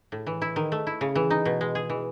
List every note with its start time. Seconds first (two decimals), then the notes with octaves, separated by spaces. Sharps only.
0.12 A2
0.27 E3
0.42 E4
0.56 D#3
0.72 A3
0.87 E4
1.01 C#3
1.15 E3
1.30 D#4
1.45 B2
1.61 G#3
1.75 G#4
1.89 E3